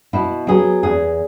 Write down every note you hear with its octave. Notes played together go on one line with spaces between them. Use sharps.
B2 E4
F#3 B3 G#4
E2 G#4